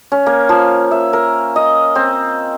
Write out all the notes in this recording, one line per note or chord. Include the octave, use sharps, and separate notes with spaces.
C#4
A#3
F3
E5
A#4
D#5
C4